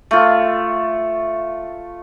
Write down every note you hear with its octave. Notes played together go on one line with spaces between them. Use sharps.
A3 F4